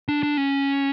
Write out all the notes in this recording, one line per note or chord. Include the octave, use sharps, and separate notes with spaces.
D4
D4
C#4